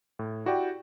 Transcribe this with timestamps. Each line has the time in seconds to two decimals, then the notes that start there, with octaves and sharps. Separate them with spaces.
0.19 A2
0.46 E4 F#4 G4 D5 G5